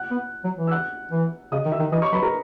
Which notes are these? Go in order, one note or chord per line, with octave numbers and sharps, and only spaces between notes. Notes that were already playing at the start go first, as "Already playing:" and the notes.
Already playing: F#5 F#6
B3
F#3
E3
E6
F#5 F#6
E3
C#3 D#5 D#6
D#3
E5 E6
D#3
E3 D#5 D#6
C#5 C#6
F#3 B4 B5
A#4 A#5